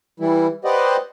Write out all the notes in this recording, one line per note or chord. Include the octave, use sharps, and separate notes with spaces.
E3 G3 E4
G4 B4 C5 D5 D#5 F#5